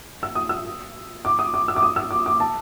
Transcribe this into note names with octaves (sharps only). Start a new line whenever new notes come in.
E6
D#6
E6
D6
D#6
D6
E6
D6
D#6
E6
D6
D6
A5